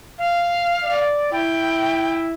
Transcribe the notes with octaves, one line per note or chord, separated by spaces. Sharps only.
F5
D5
E4 G5